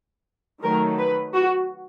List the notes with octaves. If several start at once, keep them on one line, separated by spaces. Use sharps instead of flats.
D#3 F#3 A3 A#4
B4
F#4